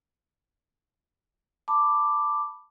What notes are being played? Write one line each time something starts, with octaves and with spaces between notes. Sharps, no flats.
A5 B5 D6